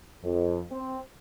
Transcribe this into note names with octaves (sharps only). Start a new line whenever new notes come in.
F2
C4